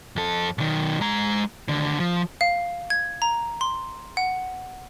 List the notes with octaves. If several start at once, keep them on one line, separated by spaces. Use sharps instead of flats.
F2 A4
B1 D#3
G#3 A#5
D#2 D3
F3
F5
G#6
A#5
C6
F#5